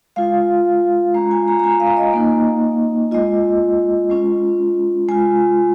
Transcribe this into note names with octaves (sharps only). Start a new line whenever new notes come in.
G#3 F4 F5
G#3 C#4 F4 A#5
G#5
A#5
A#5
G#5
F5
D#5
A#3 D#4
G#3 F4 D#5
G#3 C#4 F4
G#3 F4 G#5